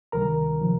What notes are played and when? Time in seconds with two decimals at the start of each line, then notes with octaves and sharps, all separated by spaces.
0.12 D2 C3 D#3 G3 A#4 A#5
0.61 C3 F3